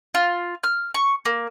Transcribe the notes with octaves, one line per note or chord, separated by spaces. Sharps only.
F4
F6
C#6
A#3